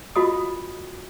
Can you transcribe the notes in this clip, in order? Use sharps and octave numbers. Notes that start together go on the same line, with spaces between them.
F4 F#4 D#5 D#6